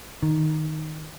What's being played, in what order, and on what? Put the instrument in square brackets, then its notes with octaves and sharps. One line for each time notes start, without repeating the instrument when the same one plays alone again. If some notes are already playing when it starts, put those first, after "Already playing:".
[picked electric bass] D#3